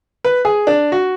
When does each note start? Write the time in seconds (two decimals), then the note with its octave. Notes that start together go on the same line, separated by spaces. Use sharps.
0.25 B4
0.45 G#4
0.67 D4
0.92 F#4